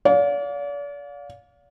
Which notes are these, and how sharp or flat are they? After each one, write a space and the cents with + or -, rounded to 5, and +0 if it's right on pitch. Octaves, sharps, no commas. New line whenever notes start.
D5 -40 F5 +25